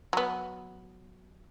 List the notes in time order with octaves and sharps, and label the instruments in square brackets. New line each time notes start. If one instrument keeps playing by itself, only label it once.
[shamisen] F#3 B3